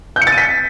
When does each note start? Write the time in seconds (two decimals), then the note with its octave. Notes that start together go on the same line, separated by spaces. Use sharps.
0.16 G6
0.22 C#7
0.27 A6
0.32 D#7
0.38 B6